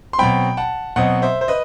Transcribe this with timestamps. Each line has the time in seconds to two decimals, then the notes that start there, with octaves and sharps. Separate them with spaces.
0.13 C6
0.18 B2 F#3 C4 G5 B5
0.57 F#5 A5
0.96 B2 F#3 C4 D#5 F#5
1.22 C5 E5
1.41 C5
1.48 B4 D#5